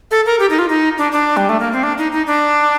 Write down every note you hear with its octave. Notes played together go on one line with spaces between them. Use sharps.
A4
A#4
G4
D#4
F4
D#4
D4
D4
G3
A3
A#3
C4
D4
D#4
D#4
D4